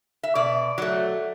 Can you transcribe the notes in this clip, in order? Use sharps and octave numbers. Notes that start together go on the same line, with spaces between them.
E5
B2 D5
F#3 A3